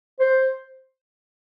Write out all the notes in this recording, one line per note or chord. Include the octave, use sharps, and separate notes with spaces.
C5